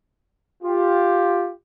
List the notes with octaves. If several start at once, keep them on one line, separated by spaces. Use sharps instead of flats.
F4 G4